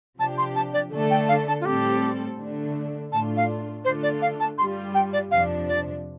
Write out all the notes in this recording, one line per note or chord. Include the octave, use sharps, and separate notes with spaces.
C3 F3 D4 G4 A5
C6
A5
D5
D3 A3 D4 A4
G5
F5
A5
F4
A2 G3 C4 G4 A4
D3 A3 D4
A2 A3 D4 F4 A5
F5
D3 A3 D4 F4 A4 C5
D5
F5
A5
G2 G3 F4 C6
G5
D5
F2 C3 F3 D4 F5
D5